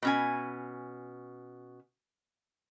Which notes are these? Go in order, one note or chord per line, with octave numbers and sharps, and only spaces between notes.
B2 C#4 G#5